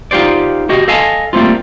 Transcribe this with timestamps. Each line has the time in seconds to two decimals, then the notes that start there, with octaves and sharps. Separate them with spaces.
0.11 D#4 F4 G4 C5 D5
0.69 F#4 G4 D#5
0.88 A4 D#5 F5 G#5 A5
1.33 G3 A3 A#3 C4 F4